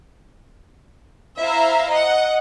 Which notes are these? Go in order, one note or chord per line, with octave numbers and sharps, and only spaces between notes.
E4 C5 E5 F5 A#5
D#5 F#5